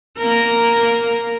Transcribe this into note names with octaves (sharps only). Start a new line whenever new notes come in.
A#3 A#4